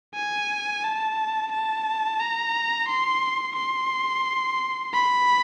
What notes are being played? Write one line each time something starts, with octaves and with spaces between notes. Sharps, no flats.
G#5
A5
A5
A#5
C6
C6
B5